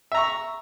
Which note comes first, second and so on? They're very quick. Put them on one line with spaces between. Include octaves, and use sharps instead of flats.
E5 A#5 C#6